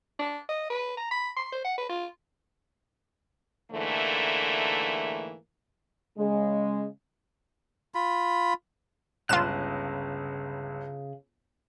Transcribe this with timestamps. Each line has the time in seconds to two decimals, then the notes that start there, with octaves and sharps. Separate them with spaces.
0.19 D4
0.49 D#5
0.70 B4
0.97 A#5
1.11 B5
1.36 C6
1.52 C5
1.65 F#5
1.78 B4
1.89 F4
3.72 G#2 D3 E3 A3 A#3
6.17 C#3 G#3
7.95 F4 B5
9.29 G1 C#2 C#3 F4 D#5 F#6 E7